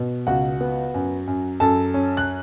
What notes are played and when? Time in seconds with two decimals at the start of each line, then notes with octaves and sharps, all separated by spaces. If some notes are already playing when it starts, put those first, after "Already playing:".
Already playing: B2
0.27 C#2 F#4 F#5
0.61 B3
0.94 F#2
1.27 F#2
1.60 F#2 A4 A5
1.94 C#4
2.17 F#6